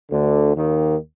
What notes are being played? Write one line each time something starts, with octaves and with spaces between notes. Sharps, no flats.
D2 D3
D#2 D#3